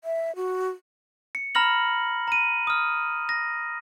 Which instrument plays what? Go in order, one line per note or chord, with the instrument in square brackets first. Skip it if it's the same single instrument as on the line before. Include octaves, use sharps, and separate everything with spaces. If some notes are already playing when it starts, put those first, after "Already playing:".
[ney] E5
F#4
[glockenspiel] C#7
A#5 B5 F6 A#6 F#7
A#5 D#7
D#6 F6
A#6